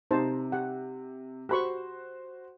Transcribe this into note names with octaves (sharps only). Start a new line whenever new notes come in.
C3 D#4 C5 A5
G4 F#5
F#4 G4 C5 B5 C#6